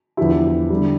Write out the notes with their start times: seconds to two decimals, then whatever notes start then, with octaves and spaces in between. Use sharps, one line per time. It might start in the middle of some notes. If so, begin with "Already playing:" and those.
0.17 E2 D3 F3 E4 G4
0.70 D3 G3